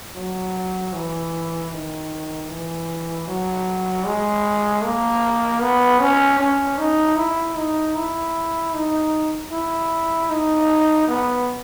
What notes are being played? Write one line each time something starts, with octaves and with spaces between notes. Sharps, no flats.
F#3
E3
D#3
E3
F#3
G#3
A#3
B3
C#4
C#4
D#4
E4
D#4
E4
D#4
E4
D#4
B3